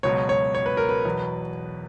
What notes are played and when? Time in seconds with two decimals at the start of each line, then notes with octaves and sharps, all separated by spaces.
0.03 C#2 B2 F#3 C#5
0.29 C#5
0.55 C#5
0.66 B4
0.77 A#4
0.89 B4
1.05 E2 B2 F#3